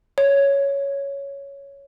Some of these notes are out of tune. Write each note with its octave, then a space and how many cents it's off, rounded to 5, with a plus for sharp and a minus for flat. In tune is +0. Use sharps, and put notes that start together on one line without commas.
C#5 +5